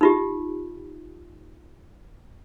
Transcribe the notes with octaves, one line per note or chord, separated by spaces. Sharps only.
D#4 F4 G4